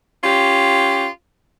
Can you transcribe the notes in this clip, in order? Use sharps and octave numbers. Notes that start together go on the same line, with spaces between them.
C#4 F4 G4